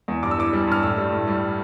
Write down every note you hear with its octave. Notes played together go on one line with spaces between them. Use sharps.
E2
G2 D6
E6
E3 D6
G3
G2 F6
A2 E6
G3
A2
G3